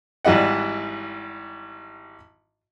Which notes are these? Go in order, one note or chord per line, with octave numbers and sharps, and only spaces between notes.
G#1 E3 G3 D#5 F#5